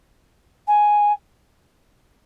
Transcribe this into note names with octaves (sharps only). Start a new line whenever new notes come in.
G#5